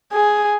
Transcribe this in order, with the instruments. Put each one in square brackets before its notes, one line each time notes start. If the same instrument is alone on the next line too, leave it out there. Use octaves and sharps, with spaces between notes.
[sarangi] G#4